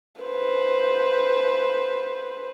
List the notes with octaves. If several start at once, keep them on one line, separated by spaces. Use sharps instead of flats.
B4 C5